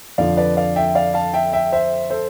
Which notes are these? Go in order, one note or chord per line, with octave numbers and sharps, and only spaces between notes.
F2 D3 F3 D5 F5
B4 D5
D5 F5
E5 G5
D5 F5
F5 A5
E5 G5
E5 G5
C5 E5
A4 C5